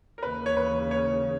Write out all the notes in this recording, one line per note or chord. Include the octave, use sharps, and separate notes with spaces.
A#4
D#2 C#3 E3 A#3 C#4 B4
C#5
B4
C#5